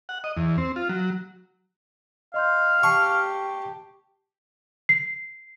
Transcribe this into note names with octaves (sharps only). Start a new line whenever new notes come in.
F#5
D#5
E2
C4
F4
F#3
D#5 F5 C6 G6
G4 G5 A5 C#6 C7
C7